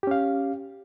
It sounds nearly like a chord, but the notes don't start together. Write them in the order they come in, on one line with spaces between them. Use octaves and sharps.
G4 C#4 F5